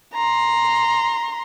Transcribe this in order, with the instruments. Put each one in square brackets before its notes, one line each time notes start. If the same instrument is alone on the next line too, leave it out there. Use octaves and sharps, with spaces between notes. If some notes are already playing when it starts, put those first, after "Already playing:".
[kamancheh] A#5 C6